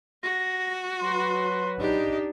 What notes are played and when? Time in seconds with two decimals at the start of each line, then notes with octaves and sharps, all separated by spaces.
0.23 F#4 A#6
1.01 F#3 B4 C6
1.80 D4 D#4 G4 D#5